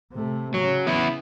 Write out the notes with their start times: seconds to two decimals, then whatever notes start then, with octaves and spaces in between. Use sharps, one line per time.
0.13 C3 A3
0.54 C#3 F#3 C#4
0.87 B3 E4